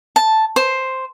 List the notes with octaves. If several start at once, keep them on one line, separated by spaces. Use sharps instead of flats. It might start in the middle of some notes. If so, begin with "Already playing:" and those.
A5
C5